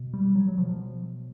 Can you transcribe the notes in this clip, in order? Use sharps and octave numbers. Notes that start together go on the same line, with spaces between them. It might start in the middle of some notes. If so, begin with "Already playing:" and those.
Already playing: B2
G3
F#3
F#3
B2 F3